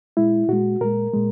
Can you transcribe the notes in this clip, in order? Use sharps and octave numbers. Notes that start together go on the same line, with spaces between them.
A#2 G#3 E4
A#2 G#3 F#4
A#2 G#3 A#4
A#2 G#3